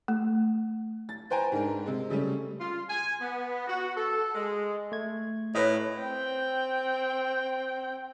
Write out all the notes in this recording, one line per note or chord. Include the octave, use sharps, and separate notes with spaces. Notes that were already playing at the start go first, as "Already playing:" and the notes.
A3
A6
B4 C5 G5 G#5 A#5
G#2 D4 A#4
C3 G#3
C#3 G3 A3 C#4
F4
G#5
B3
F#4
A4
G#3
A3 G#6
A2 B4 C#5 D#5
C4 G5